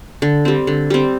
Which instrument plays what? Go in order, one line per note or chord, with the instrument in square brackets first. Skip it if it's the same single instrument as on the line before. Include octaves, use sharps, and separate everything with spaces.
[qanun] D3
G3 C4
D3
G3 C4